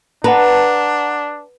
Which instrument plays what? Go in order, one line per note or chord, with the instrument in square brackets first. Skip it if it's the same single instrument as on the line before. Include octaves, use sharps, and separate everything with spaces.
[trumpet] D4 [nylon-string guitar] B4 [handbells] F#5 A5 A#5